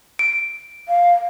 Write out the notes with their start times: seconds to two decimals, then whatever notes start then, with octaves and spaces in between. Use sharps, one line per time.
0.19 D7
0.88 F5